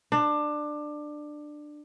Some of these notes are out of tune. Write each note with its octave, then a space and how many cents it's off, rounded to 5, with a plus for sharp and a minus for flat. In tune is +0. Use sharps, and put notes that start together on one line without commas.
D4 +20